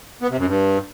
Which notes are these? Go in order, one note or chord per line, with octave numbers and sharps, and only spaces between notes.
B3
C3
F#2
G2